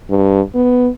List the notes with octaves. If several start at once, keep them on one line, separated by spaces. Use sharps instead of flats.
G2
B3